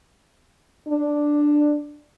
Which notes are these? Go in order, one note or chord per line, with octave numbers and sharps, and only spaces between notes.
D4